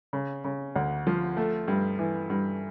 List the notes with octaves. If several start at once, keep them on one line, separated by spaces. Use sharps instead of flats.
C#3
C#3
D2
F3
A3
G2
E3
G2